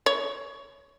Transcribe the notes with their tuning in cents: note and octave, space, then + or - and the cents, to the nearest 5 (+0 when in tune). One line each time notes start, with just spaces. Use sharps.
C#5 +10